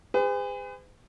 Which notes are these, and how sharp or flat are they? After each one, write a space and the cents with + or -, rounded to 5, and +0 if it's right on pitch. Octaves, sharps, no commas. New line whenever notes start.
G#4 -35 B4 +45